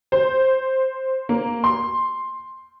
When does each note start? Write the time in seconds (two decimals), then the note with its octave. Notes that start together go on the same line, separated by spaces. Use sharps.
0.12 C5
1.29 A#3
1.64 C6